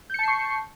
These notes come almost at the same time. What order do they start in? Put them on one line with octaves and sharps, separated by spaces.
G6 C#7 A5 C7 C#6